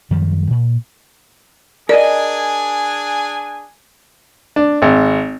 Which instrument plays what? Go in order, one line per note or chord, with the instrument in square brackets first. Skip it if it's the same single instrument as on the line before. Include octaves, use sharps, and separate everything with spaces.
[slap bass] F#2 D#3 F3 G3
A#2
[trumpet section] D4 G#4 G#5 [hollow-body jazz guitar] A#4 D#5 [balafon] D5
[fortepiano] D4
G#1